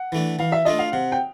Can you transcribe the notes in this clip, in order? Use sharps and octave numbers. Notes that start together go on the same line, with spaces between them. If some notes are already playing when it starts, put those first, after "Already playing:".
Already playing: F#5
E3 A3 D4
E3 F5
E5
A3 D4 F4 D#5
F5
C3 F#5
G5